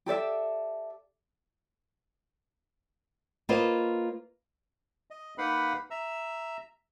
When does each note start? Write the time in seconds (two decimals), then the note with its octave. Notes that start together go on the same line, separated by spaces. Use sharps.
0.06 G4 A4 D5 E5
3.49 A#3 F4 B4 C5 D#5
5.11 D#5
5.38 A#3 D#4 B4 F5 F#5 B5
5.91 E5 A#5 E6